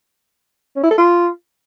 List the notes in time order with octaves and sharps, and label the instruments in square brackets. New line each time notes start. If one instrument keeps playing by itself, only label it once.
[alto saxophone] C#4
E4
A4
F4